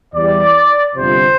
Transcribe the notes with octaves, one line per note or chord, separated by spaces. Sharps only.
E2 E3 G3 D5
G1 F2 C3 F3 C5